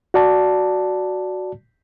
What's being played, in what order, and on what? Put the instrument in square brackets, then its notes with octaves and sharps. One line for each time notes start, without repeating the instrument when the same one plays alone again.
[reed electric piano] F#4 D5 A5